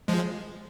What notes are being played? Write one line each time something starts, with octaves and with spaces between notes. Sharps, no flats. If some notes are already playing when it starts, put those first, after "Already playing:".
F3 G#3